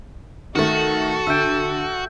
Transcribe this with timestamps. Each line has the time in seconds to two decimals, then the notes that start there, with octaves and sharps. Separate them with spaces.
0.55 D#3 A3 F#4 A4
1.27 D3 E5 G5